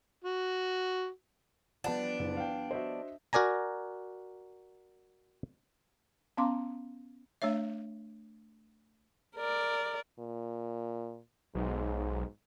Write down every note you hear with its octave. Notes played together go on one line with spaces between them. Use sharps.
F#4
F3 G3 B3 D4 F#5 A5
F#1
F5 G5
F#4 C5 D#5 E5
F#4 A#4 D5 G#5 A#5
B3 C#4 F5 A#5 C6 D6
A3 D4 C#5 E5
A#4 D5
A#2
B1 G#2